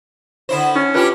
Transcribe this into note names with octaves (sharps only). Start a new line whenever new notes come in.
D3 E4 C5
C#4 D#4
D4 E4 F4 G4 B4 A5